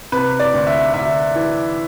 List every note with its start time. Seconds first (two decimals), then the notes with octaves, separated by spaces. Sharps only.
0.12 C3 B4
0.40 D5
0.54 D2
0.67 E5
0.94 D2 E5
1.36 E3